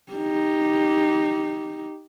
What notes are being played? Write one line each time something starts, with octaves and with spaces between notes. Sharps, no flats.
D#4 G4